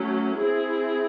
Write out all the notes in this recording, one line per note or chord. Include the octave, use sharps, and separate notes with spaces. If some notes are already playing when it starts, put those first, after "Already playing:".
Already playing: F#3 A3 C#4
C4 E4 G#4